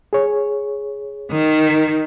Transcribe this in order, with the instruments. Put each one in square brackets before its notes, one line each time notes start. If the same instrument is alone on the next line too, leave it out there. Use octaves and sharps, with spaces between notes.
[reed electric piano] G#4 C#5
[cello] D#3